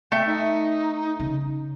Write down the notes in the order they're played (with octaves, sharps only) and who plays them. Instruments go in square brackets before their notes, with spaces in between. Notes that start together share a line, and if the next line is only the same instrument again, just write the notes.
[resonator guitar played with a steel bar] A3 E5 [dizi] G5
[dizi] D#4
[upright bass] C#3